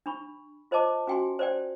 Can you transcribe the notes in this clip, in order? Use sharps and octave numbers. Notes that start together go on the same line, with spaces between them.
D4 B5 C#6
F4 C5 D#5 A5 D6
C#4 F#4 G5 G#5 C6
C5 D5 G5